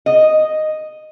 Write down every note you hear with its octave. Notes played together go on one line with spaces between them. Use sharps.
D#5